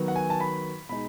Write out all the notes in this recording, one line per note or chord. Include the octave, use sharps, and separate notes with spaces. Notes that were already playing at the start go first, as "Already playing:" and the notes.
Already playing: D#3 F#3 B3
F#5
G#5
A5
B5
B2 G#3 D#4 B5